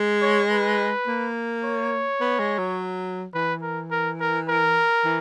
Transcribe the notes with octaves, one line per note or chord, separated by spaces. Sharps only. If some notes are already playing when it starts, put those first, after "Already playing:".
Already playing: G#3
C#5
B4
A#3
C#5
B3
G#3
F#3
E3 B4
A#4
A#4
A#4
A#4
E3